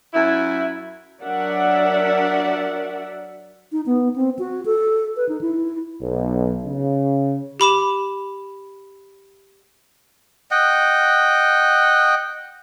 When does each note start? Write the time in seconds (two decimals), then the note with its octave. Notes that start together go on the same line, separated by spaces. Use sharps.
0.14 F#2 E4
1.23 F#3 D4 A#4 D5 E5 F#5
3.72 D#4
3.86 B3
4.16 C4
4.39 F#4
4.66 A4
5.17 B4
5.29 D#4
5.41 E4
6.02 B1
6.66 C#3
7.60 G4 B5 D6 E7
10.51 D#5 F#5 G5